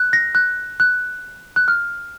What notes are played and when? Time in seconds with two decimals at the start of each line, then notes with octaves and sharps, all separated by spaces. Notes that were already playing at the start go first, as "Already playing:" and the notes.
Already playing: F#6
0.13 A#6
0.35 F#6
0.80 F#6
1.56 F#6
1.68 F6